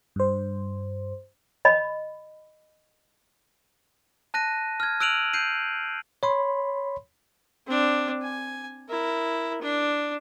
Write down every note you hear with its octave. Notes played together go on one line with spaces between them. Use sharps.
G2 C5
D#5 B5
A5 F#6 A#6 D#7
F6 G#6
E6 F#6 D7 D#7 F7 F#7
G6 C7 D#7
C#5 B5 C6
C4 D4
G#5
E4 A#4
D4